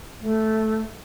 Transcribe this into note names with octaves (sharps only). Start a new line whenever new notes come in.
A3